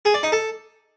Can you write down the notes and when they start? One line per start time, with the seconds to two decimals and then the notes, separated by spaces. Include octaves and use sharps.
0.05 G#4
0.14 D5
0.23 D#4
0.32 A4